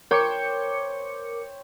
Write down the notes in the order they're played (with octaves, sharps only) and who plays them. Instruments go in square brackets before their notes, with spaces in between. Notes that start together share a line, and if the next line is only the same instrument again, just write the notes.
[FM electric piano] A#4 D6 C#7 [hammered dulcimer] C5 C#5 G5